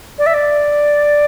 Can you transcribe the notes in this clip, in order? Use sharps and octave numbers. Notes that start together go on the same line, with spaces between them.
D5
E5
D5